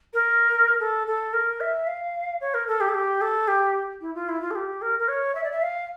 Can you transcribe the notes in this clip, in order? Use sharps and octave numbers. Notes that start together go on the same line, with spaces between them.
A#4
A4
A4
A#4
E5
F5
C#5
A#4
A4
G4
A4
G4
A4
G4
E4
F4
E4
F4
A4
G4
A#4
A#4
C#5
E5
D5
E5
F5